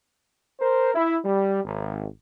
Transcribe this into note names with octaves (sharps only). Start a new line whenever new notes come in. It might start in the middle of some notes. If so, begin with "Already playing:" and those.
A#4 C5
E4
G3
G#1